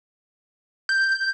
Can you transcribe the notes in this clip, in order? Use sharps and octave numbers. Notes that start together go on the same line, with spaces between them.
G6